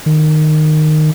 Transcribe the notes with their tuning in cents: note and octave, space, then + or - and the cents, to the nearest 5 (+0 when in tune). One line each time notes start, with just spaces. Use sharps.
D#3 -15